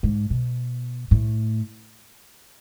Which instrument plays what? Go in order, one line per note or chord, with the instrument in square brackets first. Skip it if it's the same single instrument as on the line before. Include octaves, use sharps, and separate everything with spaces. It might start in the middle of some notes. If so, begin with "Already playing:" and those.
[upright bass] G#2
B2
A2